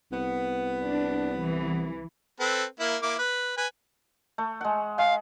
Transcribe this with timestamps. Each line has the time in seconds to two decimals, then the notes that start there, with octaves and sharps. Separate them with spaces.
0.12 C2 B3
0.84 D4
1.39 E3
2.40 C4 A4 B4
2.80 A#3 E4
3.02 A#3 E4 D6
3.19 B4
3.58 B4 G#5
4.38 A3
4.61 G#3 F#5
4.98 G#3 F5